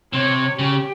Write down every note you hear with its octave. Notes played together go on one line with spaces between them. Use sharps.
C3 C#5
C#3 G4